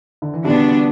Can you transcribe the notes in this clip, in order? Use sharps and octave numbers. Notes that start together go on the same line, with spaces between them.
D3
E3
B2 D3 G3 B3 D4